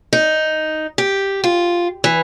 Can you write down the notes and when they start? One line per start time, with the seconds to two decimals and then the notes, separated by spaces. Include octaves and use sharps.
0.13 D#4
0.98 G4
1.44 F4
2.04 E3